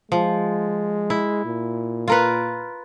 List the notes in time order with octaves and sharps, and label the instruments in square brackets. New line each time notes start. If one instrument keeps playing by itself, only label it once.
[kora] F3 [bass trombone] G#3
[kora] E4
[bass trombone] A#2
[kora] F4 A#4 B4